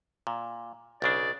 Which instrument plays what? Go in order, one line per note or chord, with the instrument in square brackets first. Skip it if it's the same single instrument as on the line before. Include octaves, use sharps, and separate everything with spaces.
[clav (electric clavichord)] A#2
[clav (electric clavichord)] B1 C#3 D4 [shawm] D5